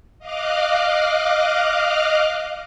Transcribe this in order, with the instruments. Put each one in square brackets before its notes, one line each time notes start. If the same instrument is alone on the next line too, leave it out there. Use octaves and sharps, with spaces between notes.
[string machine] D#5 F5 D6 F6 F#6